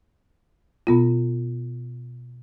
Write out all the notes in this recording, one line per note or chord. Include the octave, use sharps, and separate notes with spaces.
B2 B3 F4